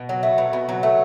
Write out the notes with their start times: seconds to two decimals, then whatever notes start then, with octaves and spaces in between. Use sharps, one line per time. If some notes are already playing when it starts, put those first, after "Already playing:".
Already playing: B2
0.09 F#3
0.23 A3
0.38 B2
0.53 B2
0.69 F#3
0.83 A3